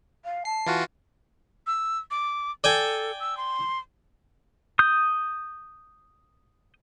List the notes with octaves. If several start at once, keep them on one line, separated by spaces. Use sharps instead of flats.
F5
A5 C7
E3 F4 F#4
E6
D6
A4 D5 G5 G#5
E6
C6
D#6 G6